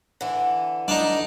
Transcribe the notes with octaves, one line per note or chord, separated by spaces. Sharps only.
D3 E3
D4 D#4